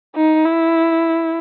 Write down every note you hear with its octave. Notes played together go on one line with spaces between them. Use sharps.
D#4
E4